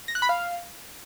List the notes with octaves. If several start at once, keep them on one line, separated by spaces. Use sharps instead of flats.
A#6
F#6
B5
F5